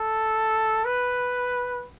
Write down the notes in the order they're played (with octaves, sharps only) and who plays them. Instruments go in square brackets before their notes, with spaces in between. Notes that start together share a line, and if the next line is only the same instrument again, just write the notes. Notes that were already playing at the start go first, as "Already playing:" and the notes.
Already playing: [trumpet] A4
B4